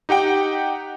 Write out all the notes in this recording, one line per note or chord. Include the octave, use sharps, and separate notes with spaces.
D#4 G4 F#5 G5